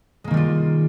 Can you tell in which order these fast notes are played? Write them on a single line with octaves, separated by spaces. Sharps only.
G#3 A#3 D#3 G3 F4